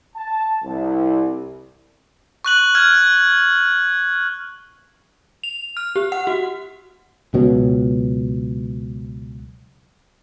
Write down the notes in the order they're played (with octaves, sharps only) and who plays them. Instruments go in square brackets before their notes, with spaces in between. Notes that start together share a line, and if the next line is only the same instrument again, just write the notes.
[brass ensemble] A5
C2
[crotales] C#6 F#6 F#7
F6 G#6
[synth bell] F7
F6
G4
F#5
F#4
[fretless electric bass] C#2 B2 F#3